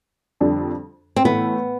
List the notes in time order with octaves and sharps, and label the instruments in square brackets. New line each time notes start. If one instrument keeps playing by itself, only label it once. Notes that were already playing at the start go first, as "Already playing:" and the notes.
[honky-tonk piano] F2 D3 G3 D4 A4
[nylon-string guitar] C4
[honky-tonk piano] A2 E3 A3 E4 [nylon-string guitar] B3